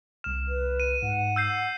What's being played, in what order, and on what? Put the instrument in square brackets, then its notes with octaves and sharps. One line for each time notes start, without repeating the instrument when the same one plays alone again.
[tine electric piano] C2 F6 [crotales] E7
[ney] B4
[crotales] D#7
[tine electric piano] G#2 [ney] F#5
[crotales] E6 G6 C7